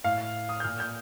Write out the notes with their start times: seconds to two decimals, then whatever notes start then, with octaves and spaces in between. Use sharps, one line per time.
0.04 A2 F5
0.49 D#6
0.60 G6
0.64 A#2 F6
0.80 G6